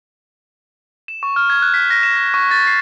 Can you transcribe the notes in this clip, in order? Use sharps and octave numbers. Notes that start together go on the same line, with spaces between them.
E7
C#6
F6
G#6
F#6
B6
A#6
E7
A#6
C#6
A6
C7